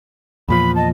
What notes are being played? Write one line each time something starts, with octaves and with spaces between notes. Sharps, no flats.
E2 A#2 F3 B5
D#5 A5